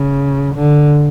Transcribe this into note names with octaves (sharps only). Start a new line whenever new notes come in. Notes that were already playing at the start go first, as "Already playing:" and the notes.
Already playing: C#3
D3